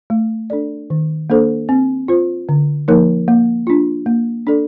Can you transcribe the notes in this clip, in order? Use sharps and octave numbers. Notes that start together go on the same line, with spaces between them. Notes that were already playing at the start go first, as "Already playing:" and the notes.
A3
D4 A4 D5
D#3
A#3 D4 A4 C5
C4
F4 C5
D3
F3 A#3 D#4 A#4
A#3
D4 F4
A#3
D4 A4 D5